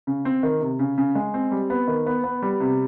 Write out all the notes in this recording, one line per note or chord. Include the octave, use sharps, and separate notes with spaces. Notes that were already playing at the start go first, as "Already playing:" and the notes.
C#3
C4
D#3
C3
C#3
C#3
G#3
C4
G3
B3
D#3
B3
B3
G3
C3